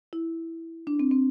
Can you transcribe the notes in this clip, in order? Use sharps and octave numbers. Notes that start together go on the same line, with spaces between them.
E4
D4
C4
C4